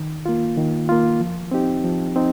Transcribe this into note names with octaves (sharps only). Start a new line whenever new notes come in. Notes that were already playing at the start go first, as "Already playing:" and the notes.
Already playing: D#3
A#3 F4
D#3
A#3 F4
F3
C4 D#4 G4
F3
C4 D#4